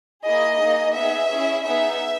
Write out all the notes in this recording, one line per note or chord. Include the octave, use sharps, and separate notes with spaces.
A#3 E4 G#4 D#5
A#3 D#4 G#4
B3 D#4 G#4 E5
C#4 E4 G#4
B3 D#4 G#4 E5